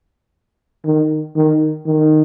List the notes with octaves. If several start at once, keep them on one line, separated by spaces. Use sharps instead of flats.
D#3
D#3
D#3